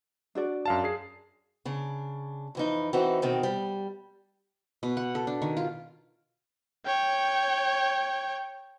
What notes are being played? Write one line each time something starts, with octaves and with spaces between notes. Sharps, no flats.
D4 F#4 D5
F#2 F5 A5
G#4 C7
C#3 D4
F2 E3 D#4
E3 C4 D#4 F#4
B2 D#3 C4
G3
B2
F#5
A4
D4
D#3
F4
C#5 G5